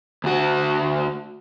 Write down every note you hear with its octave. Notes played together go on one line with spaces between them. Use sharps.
D2 F#4